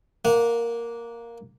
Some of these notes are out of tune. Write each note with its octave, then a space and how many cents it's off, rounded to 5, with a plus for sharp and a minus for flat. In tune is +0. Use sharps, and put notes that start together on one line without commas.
A#3 +0 F#5 -20